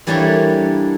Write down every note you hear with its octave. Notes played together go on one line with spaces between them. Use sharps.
E3 G3 A#3 D4 A4 C#5